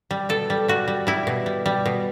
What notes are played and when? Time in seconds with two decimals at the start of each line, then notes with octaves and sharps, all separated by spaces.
0.11 G3
0.29 B2 A4
0.50 G3
0.68 G3 F#4
0.88 G3
1.07 G3 E4
1.27 B2
1.46 G3
1.66 G3
1.86 B2